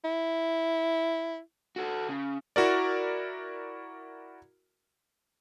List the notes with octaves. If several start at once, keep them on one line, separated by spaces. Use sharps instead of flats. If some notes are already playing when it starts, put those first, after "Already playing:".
E4
F#4 A4
C#3
E4 F#4 A#4 D5